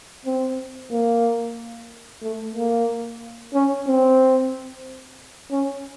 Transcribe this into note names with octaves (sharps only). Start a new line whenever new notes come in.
C4
A#3
A3
A#3
C#4
C4
C#4